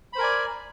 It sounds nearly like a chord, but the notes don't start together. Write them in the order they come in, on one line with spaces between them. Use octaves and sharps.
B5 C5 A#4 G#5 D5